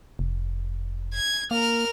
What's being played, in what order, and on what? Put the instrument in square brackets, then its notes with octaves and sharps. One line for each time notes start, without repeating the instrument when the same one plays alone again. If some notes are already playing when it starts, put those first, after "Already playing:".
[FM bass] F1
[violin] G#6
[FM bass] A#3 [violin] A#4 F6